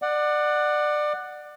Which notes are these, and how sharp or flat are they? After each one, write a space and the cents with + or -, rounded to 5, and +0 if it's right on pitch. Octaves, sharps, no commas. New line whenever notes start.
D5 +25 F#5 +0